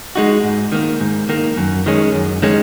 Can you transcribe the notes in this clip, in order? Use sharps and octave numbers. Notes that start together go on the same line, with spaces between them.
G#3 D#4 F#4
G#2
D#3 A#3
G#2
D#3 A#3
F#2
D#3 G#3 C#4
F#2
D#3 G#3 C#4